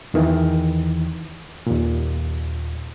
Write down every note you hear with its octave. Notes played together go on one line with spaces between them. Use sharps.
E2 D#3 E3
D#2 A#2